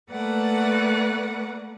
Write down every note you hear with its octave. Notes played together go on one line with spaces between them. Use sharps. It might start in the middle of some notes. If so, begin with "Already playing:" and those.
A3 A#3 B4 D5 F#5